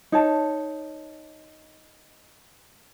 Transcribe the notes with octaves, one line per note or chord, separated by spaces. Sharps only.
D#4 C#5 A5